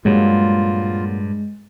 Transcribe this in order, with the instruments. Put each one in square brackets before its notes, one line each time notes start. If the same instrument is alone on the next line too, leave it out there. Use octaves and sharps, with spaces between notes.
[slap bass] G2 [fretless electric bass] A#2 F#3 [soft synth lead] G#3 [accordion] F4